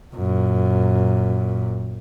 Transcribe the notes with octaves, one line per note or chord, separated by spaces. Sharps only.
F#2 A#2